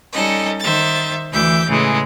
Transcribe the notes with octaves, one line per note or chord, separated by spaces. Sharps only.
G3 C#4 D#4 A4 D#5
D#3 C5 E5 A6
D2 E3 E5 D6 G6
A2 C#3 E3 G#3